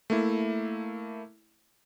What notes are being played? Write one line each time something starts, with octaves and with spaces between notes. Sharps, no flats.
A3 A#3 E4